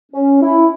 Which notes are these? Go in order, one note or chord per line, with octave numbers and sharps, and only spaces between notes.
C#4
E4